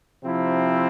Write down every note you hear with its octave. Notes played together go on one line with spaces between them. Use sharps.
C3 F3 C4 E4